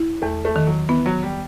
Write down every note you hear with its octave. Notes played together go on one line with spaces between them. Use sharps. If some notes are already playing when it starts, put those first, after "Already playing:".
Already playing: E4
E2 A3
A3
D#3
F#3
E3 B3
F#3
G3